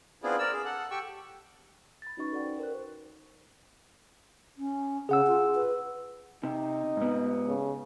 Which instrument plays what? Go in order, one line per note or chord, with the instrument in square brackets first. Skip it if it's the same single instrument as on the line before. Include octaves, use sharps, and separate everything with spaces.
[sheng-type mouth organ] B3 C4 D4 E4 F4 G#4
A#4 D5 E6
G#4
A4 F#5
G4 A4 G5 C#6 E6
[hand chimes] B5 A6
C#4 D#4 F#4 B4 D#5 C#6
A4 D5 F#5 G5
C5
A#4 C5 F#6
[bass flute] C#4
[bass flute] C#3 [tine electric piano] G#4 F#5 E6
[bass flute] F4
B4
[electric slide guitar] C3 [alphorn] D#4
[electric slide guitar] G#2 B3
[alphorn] C#3